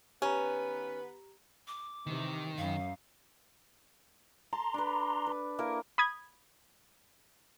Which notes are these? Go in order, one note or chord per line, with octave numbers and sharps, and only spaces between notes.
D#3 B3 C#4 G4 B4 A#5
D6
C3 D#3 E3
F#2 F5
A5 A#5 C6
D4 B4
B4
A#3 E4 A#4
B5 D#6 G#6